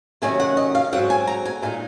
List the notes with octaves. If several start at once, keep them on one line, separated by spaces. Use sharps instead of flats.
C3 D#3 F#3 A#3 C#4 G#5
F#5
D#5
F5
G#2 F#3 C4 F#5
G#5
A#5
G#5
A#2 G#3 D#4 G#5